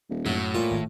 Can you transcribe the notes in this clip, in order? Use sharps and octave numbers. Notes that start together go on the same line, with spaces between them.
D#1
F#2 A2 F#3
A#2 F4
G#1